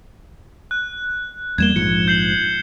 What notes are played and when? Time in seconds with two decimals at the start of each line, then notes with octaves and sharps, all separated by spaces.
0.71 F#6
1.58 E2 G3 A#3 G#6 E7 G7
1.76 A#1 G#2 F3 C#7
2.08 G6 C7 F#7